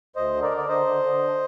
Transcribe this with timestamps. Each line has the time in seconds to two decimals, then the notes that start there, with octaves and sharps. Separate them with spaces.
0.16 D2 C5 D#5
0.33 D3
0.42 A#4 D5
0.51 D3
0.57 D5
0.68 D3 C5 D#5
0.86 D3
1.03 D3